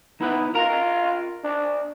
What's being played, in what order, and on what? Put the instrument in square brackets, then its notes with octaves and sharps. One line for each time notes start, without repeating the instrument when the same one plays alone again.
[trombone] B3 [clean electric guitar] D#4 E4 B4
[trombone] F4 [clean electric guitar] A#4 A#5
[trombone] D4